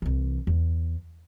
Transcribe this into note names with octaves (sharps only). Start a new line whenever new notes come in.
C2 E3
E2